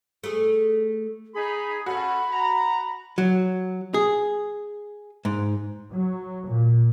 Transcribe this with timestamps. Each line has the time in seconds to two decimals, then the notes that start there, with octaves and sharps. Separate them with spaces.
0.24 A3 G#4
1.34 D#4 G#4 B5
1.86 C#4 F#4 A4 F#5 B5
2.31 A#5
3.18 F#3
3.94 G#4
5.25 G#2
5.92 F#3
6.47 A#2